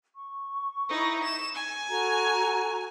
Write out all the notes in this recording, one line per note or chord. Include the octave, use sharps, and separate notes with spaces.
C#6
D#4 E4
E7
G#5
F#4 A4 A#5